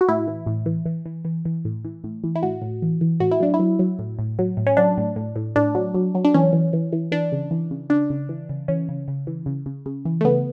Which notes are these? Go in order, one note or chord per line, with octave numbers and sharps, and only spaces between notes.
F#4
A2 E4
E3
A2
E3
E3
E3
E3
E3
A2
E3
A2
E3
E4
A2 F#4
A2
E3
E3
A2 F#4
E4
F#3 D4
E4
F#3
F#3
A2
A2
F#3
A2
C#4
F#3 D4
A2
A2
A2
A2 D4
F#3
F#3
F#3
D4
E3 C#4
E3
E3
E3
E3 D4
C#3
E3
C#3
C#3 D4
C#3
E3
C#3
E3 C#4
C#3
C#3
E3
C#3
C#3
C#3
E3
A3
C#3 B3